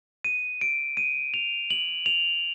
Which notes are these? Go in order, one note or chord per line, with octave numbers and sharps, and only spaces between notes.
D#7
D7
D#7
F7
F#7
F7